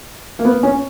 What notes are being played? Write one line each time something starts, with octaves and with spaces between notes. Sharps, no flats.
A#3
B3
C#4